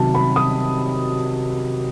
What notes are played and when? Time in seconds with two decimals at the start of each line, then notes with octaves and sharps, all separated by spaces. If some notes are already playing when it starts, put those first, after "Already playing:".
Already playing: C3 D#3 F#3 A5
0.15 B5
0.36 D#6